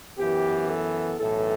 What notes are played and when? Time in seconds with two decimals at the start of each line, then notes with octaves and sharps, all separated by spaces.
0.17 F#2 E3 B3 G4
0.68 A4
1.18 B1 A2 E3 A4